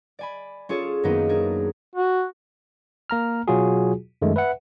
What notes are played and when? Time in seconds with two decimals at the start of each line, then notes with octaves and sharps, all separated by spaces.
0.19 D5 G#5 B5
0.69 C#4 F4 G#4 A4 C#5
1.03 F#2 D#3 A#3 B3 D#4
1.29 D4 G#4 A#4
1.96 F#4
3.10 A#3 A#5 F6
3.48 B2 F#3 F4 F#4 G#4
4.22 F#2 D#3 G#3 A3
4.36 B4 E5 F#5